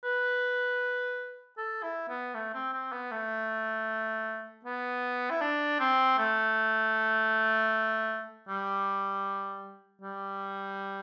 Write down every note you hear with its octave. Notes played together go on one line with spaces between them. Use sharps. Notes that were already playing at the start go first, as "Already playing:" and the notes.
B4
A4
E4
B3
A3
C4
C4
B3
A3
B3
E4
D4
C4
A3
G3
G3